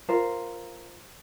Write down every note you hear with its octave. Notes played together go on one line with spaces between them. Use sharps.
F4 A#4 C5